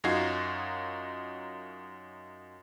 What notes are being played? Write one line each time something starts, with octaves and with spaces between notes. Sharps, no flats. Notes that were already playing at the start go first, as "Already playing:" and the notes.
F#2 D#4 F4 F#4 G#6 C7